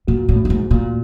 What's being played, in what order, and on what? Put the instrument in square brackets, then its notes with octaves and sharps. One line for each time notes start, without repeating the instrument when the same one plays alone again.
[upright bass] A#2 [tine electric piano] F#4
[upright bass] A2
[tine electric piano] A3
[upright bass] G2
G#2
[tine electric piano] A3
[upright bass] A#2